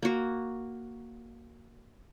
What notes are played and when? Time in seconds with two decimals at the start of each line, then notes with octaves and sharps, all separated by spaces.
0.02 A#3 F#4